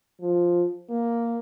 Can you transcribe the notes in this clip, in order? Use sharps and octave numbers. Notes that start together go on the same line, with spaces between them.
F3
A#3